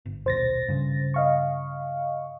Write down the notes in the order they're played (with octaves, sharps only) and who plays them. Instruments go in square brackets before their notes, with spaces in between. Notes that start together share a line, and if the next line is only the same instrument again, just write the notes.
[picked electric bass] G1
[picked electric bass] D#1 B1 [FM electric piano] C5 A6 A#6
[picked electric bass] G2 C#3
[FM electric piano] D#5 F5 C#6